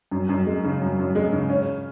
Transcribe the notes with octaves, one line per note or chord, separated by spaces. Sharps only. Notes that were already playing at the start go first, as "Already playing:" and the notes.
F#2
F#2
G#3
C#3
F#2
F#2
G#3
C#3
C#4